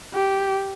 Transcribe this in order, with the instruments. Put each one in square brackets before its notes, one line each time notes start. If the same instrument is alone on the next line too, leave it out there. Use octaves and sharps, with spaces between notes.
[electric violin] G4